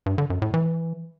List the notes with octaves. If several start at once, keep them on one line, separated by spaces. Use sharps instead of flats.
G2
D3
F#2
A2
E3